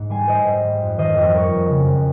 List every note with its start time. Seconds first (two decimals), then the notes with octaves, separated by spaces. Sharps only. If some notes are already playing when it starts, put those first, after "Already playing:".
Already playing: G#2
0.10 G3 G#5 C6
0.28 G3 C5 D#5
0.46 G#2
0.64 G3
0.81 F2
0.98 D#3 C5 D#5
1.16 F2
1.32 G3 A#4 C#5
1.51 F2
1.68 C#3
1.86 F2